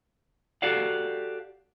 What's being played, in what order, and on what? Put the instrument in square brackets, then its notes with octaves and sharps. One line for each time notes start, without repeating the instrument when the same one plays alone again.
[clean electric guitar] F#4 G4 A4 D5 F5 F#5